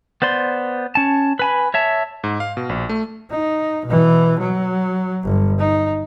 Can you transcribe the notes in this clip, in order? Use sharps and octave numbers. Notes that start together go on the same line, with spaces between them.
B3 C5 D5 C6
C#4 A5
B4 G#5 B5
C#5 E5 A5
G#2
F5
B2
A#1
A3
D#4
B2 E3
F#3
G1
D#4